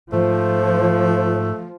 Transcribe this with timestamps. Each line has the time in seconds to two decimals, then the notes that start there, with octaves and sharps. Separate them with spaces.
0.12 G#2 F3 A3 C5